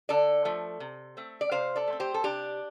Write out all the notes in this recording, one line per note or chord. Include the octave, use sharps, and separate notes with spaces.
D3 A4 D5
F3 A3
C3
A3 C4
D5
C3 C5 F5
A4 D5
A3 C4
G4 C5
A4
C3 D4 G4